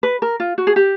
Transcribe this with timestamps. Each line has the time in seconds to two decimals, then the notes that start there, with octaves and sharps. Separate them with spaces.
0.03 B4
0.22 A#4
0.40 F4
0.58 F#4
0.67 G#4
0.76 G4